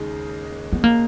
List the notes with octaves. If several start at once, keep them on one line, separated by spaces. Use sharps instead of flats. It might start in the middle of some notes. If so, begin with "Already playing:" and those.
Already playing: D#2 C#3 G#3 D#4
B3
A#3